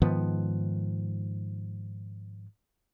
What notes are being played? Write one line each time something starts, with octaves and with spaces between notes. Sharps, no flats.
G#2 D#3 F3 B3